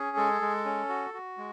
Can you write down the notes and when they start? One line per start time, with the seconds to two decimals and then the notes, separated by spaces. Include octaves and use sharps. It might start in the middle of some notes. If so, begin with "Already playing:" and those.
Already playing: C#4 G#4
0.17 G#3 A4
0.42 G#3
0.65 C#4
0.89 F#4
1.14 F#4
1.38 G#3